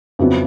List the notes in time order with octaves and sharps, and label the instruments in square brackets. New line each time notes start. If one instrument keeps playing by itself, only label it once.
[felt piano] F2 C#3 F#3 B3 E4